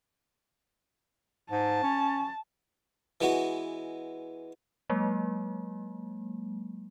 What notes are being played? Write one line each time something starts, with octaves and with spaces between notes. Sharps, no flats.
G#2 A5
C#4
E3 G#3 B3 F#4
F#3 G#3 A#3